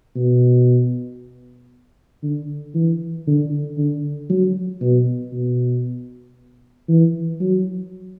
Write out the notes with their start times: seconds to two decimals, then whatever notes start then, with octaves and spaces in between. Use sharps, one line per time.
0.16 B2
2.23 D3
2.75 E3
3.27 D3
3.78 D3
4.30 F#3
4.81 B2
5.33 B2
6.88 E3
7.40 F#3